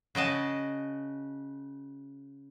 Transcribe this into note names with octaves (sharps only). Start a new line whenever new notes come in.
C#3 F#4 D#5 A5